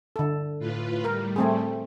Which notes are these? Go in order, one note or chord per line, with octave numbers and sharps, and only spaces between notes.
D3 A4
A2 F4 B4
A2 G3 A#4
A3 C4 G#4